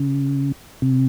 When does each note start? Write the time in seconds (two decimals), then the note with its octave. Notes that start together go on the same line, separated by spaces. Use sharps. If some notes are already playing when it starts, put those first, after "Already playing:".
Already playing: C#3
0.82 C3